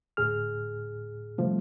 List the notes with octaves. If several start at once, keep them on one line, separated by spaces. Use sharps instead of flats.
D2 A2 G#4 F6
C3 F3 G3 A3